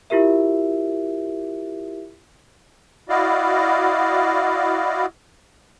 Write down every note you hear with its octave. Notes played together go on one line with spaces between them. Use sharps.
E4 F4 G4 A#4 E5
E4 F#4 D5 D#5 F5